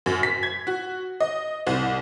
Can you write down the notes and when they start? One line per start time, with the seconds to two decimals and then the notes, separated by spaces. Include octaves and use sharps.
0.06 F#2
0.23 B6
0.43 G#6
0.67 F#4
1.20 D#5
1.67 C2